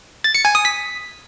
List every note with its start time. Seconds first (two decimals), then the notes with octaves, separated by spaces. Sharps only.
0.24 A6
0.35 C#7
0.45 G#5
0.55 D#6
0.65 B6